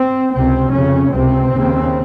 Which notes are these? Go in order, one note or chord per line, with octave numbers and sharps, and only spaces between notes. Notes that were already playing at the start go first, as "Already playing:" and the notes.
Already playing: C4
C#2 C3 C4
F2 C#3 C#4
C#2 C3 C4
D#2 C#3